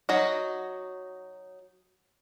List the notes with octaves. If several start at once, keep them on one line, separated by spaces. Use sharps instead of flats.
F#3 D#4 F#4